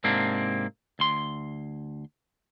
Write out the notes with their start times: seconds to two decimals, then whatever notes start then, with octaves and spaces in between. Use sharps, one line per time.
0.04 G#2 C3 A#3 C4 D4
0.99 D2 C6